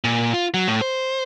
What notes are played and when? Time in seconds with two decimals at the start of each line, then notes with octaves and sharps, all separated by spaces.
0.04 A#2
0.34 F4
0.54 F#3
0.68 A2
0.81 C5